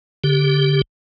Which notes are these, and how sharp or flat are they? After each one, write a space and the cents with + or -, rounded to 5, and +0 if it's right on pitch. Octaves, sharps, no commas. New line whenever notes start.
D3 -25 G4 +0